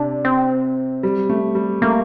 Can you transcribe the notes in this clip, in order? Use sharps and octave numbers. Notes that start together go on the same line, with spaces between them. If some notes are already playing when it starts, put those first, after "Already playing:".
Already playing: C3 D4
C4
G3
A3
G3
A3 A#3